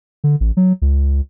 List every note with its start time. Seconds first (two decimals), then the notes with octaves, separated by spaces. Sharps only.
0.24 D3
0.40 A1
0.57 F#3
0.82 C#2